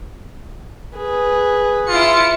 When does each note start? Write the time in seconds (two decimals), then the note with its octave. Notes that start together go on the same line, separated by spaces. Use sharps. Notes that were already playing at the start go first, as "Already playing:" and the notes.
0.97 G#4 B4
1.88 E4 F4 C#7